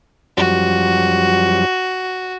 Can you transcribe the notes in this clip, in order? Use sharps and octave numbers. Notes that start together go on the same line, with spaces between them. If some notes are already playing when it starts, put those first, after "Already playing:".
F#2 F3 G3 F#4